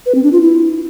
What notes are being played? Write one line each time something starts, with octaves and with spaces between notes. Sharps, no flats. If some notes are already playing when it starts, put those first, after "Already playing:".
B4
C4
D4
F4
E4